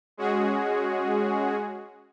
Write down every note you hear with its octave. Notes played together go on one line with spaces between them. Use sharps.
G#3 C#4 F#4 G#4